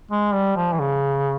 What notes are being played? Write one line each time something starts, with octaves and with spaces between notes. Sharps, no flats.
G#3
G3
F3
E3
C#3